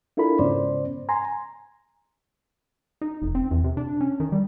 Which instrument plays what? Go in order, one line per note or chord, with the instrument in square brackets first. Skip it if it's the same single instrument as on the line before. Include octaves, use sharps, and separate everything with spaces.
[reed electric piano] D4 E4 F4 A4 A#4 B5
G#2 C#3 B3 C#4 C5 D5
G#5 A#5 C6
[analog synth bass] D#4
F1
C4
E2
C3
D4
C#4
D#3
G3